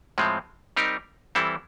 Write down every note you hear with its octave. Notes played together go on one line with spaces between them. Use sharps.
A2 F3 G#3 C4
G3 C4 D#4 G4 A#4
E3 G3 C4 E4 A4